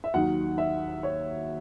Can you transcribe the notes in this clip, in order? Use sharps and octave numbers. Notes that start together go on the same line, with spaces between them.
E5
D#2 D#3 F#3 F#5
E5
C#5